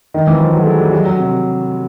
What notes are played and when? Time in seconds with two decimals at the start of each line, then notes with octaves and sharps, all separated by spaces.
0.14 D#3
0.27 E3
0.40 F3
0.54 F#3
0.61 A3
0.66 G#3
0.79 G3
0.92 F#3
1.06 F#3
1.19 C3